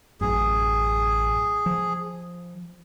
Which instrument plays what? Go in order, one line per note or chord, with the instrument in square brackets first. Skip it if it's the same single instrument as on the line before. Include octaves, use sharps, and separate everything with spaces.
[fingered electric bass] A1 F#2 [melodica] G#4
[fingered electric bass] F3